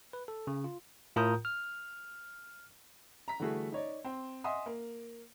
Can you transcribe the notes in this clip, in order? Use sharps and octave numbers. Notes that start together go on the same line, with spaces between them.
B4
A4
C#3
F4
A2 F4 A#4 A#5 D#6 G6
F6
A#5 B6
D3 E3 G3 A3 F#4 G#4
D#4 C#5 D5
C4
D#5 E5 F#5 G#5 C6 D#6
A#3